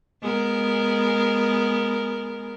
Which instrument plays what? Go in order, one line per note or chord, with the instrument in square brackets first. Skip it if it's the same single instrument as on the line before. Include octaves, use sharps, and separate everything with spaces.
[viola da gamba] G#3 B3 A#4